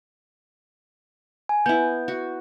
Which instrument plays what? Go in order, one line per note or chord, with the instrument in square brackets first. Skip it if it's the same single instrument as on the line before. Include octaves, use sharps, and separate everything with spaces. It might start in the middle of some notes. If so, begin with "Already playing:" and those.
[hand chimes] G#5
[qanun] B3 E4 [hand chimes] G6
[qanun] F#4